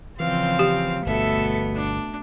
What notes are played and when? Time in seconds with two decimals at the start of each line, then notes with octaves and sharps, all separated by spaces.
0.20 C#3 E3 F3 C4 F5
0.59 G4
1.06 G1 B2 A3 B3 A4 E5
1.75 D4